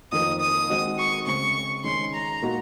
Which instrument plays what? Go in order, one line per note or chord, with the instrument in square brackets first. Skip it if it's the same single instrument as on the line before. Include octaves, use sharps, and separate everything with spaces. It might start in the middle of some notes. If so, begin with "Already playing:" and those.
[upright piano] F2 D#3 A#3 [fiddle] D#6
[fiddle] D#6
[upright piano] D#3 G#3 C4 F#4
[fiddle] C#6
[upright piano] C#3 G#3 C4 [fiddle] C#6
[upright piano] D#3 G#3 C#4 G#4 [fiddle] C6
[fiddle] A#5
[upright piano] A#2 G#3 D#4 F#4